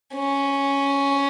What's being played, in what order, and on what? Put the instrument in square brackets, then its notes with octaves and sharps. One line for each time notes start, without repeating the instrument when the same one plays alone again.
[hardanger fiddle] C#4